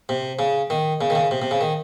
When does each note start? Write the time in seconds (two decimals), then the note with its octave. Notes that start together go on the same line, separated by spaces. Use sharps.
0.09 C3
0.39 C#3
0.70 D#3
1.01 C#3
1.10 D#3
1.15 C#3
1.31 C3
1.42 C3
1.51 C#3
1.61 D#3